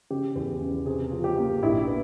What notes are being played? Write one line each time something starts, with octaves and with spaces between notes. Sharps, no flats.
C#3 G4
E2
C#3
C3 G#4
F3
G4
A#3
A#1 E4
B3